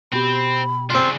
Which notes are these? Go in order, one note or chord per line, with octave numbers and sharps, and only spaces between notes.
B2 C4 G4 B5
C#3 C4 D4 F4